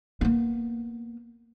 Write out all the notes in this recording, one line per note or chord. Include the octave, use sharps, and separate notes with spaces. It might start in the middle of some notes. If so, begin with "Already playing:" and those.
A#3 B3